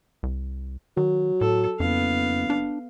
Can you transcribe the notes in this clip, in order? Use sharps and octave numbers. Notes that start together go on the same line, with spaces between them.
C2
D#3 F#3
A2 A4
F#1 F2 B3 F5
D4